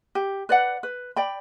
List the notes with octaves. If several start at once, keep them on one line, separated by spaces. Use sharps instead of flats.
G4
B4 D5 F#5
B4
D5 G5 B5